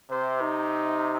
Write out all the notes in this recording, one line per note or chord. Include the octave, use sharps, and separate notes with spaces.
C3 C5
D#4